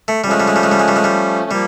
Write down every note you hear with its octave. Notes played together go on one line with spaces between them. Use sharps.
A3
F3 G3 A3 C#4
G#3
G3
G#3
G3
G#3
G3
G#3
G3
G#3
G3
F3 G3 A#3